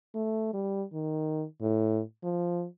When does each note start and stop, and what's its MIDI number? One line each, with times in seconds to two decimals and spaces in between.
0.15 0.51 57
0.54 0.84 55
0.93 1.45 51
1.62 2.02 45
2.24 2.66 53